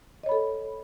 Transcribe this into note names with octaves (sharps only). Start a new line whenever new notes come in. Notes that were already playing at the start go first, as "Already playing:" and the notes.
A4 C#5 D#5 B5